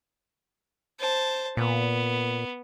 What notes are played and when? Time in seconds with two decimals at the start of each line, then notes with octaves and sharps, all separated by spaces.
1.00 C5 A5
1.57 A#2 B3